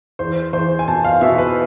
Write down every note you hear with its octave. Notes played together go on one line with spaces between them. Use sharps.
E2 C5
E2 C5
G#5
B2 A5
F5
B2 E5
B4